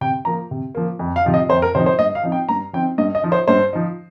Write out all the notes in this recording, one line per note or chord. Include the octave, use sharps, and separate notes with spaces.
C3 G5
F3 A#3 A#5
C3
F3 A#3
F2
F5
C3 F3 D#4
D#5
F2 C5
A#4
C3 F3 D#4 C5
C5
G2 D#5
F5
F3 C4 D#4
G5
G2 A#5
F3 C4 D#4 G5
G2 D#5
D#5
F3 D#4
C5
G2 C5
F3 D#4